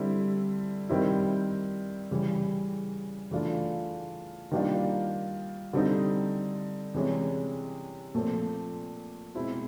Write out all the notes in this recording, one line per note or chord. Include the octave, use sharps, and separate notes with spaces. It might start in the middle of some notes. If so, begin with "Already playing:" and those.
Already playing: D3 G3 C4 E4
D#3 G3 C4 E4
C#3 E3 G3
C#3 E3 A3 D4 F4
D#3 G3 A#3 D4 F4
D3 G3 C4 D#4
C3 E3 G#3 C#4
A#2 F3 A3 C4
B2 G#3 C4 E4